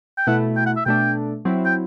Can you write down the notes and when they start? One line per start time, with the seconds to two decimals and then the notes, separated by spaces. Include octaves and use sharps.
0.18 G5
0.27 B2 A3 E4 F#5
0.57 G5
0.66 F#5
0.76 E5
0.86 B2 A3 D4 G5
1.45 F#3 C4 E4
1.65 G5